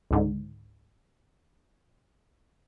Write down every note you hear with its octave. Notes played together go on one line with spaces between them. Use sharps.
C#2 G#2 D3